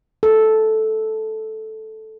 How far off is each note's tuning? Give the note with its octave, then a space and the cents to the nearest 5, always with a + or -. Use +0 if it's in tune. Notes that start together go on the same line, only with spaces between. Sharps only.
A4 -5